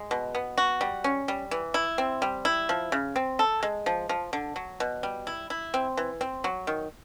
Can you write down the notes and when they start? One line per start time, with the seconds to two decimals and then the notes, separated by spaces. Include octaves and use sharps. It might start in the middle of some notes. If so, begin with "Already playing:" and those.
Already playing: G#3
0.11 B2
0.35 B3
0.58 F#4
0.81 G3
1.04 C#4
1.28 G3
1.51 E3
1.74 E4
1.98 C4
2.22 G3
2.45 E4
2.69 F3
2.92 C#3
3.16 C4
3.39 A4
3.63 G#3
3.86 F3
4.09 F3
4.33 D3
4.56 F#3
4.80 B2
5.03 G3
5.27 E4
5.50 E4
5.74 C4
5.97 E3
6.21 C4
6.44 F#3
6.67 D#3